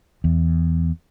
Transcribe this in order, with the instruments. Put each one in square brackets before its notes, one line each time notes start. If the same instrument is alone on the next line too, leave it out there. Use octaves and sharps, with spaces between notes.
[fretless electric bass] E2